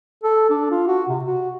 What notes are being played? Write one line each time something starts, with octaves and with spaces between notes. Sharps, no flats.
A4
D4
F4
F#4
C3
F#4